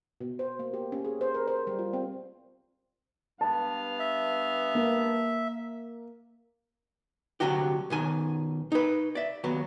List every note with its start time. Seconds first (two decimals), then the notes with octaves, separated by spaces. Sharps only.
0.21 B2
0.39 C5
0.59 A#3
0.74 G4
0.92 C#4
1.05 G#4
1.21 C5
1.34 A#4
1.48 C5
1.67 G3
1.79 F4
1.93 C4
3.41 G2 B3 F5 A5
4.00 E5
4.75 A#3
7.40 C2 D3 F#3 F#4 G4
7.90 B1 D#3 G#5
8.72 D#4 B4
9.15 D5 E5
9.44 D#2 F#3 B3